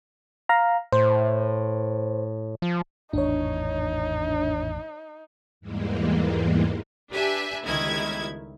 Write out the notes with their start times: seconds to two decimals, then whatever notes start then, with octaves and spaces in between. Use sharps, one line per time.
0.49 F5 A#5
0.92 A2 C5
2.62 F3
3.13 G#1 E2 A2 D4 D#4 C#5
5.61 E2 G#2 E3 G3 G#3 A#3
7.11 D4 G4 B4 E5 G#5
7.65 G1 C#2 D#3 E4 G#6